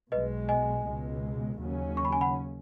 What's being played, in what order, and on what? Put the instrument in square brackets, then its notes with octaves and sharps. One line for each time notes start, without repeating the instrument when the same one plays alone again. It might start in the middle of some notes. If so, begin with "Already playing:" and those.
[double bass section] B1 B2 G#3 [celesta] B4 D#5
[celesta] D#5 G#5
[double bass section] C#2 B2 G#3
D#2 C#3 F#3 C#4
[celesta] C#6
B5
G#5
F#5 B5